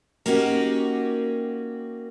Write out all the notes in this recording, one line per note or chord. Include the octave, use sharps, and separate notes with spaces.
A#3 C#4 D#4 F#4 G4